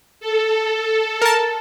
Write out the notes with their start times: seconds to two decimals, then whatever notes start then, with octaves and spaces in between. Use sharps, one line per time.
0.20 A4
1.22 A#4 A5